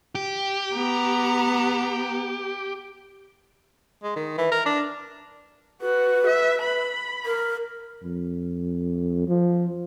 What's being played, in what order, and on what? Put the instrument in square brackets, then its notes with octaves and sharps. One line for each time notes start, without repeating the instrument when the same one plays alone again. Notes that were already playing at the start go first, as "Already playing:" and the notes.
[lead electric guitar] G4
[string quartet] B3 A#5
[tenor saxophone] G#3
D#3
E3
A#4
D4
[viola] F#4 [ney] B4
[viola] E5
B5
[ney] A#4
[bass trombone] F2
F3